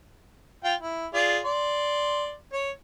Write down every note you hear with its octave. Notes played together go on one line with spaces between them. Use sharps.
F4 F5 G5
E4
F4 G#4 D5
D5 C6
C#5